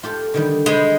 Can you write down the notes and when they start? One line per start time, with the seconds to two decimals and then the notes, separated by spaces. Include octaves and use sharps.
0.03 F4 G4 A4
0.34 D3 D#3 G3
0.66 G#3 C5 G5 B5